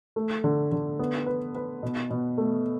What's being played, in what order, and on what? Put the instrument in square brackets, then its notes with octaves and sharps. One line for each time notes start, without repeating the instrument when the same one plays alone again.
[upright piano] A3
D3
D3
B3
B4
B4
B2
B2
A3